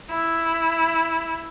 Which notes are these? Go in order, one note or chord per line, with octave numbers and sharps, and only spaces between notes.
E4